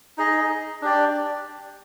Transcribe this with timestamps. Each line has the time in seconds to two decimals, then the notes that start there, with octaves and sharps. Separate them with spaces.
0.18 D#4 G#4 D#5
0.82 D4 G4 D5